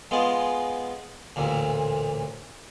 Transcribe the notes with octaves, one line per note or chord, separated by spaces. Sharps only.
G#3 B3 F4
A1 D2 A#2